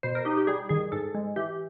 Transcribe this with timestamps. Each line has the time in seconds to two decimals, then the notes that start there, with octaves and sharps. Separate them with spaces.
0.03 B2 C5
0.15 A#4
0.25 D#4 G4
0.37 G4
0.47 G3 G#4
0.69 D#3 G#4
0.92 G#2 A4
1.15 G#3
1.36 E3 G4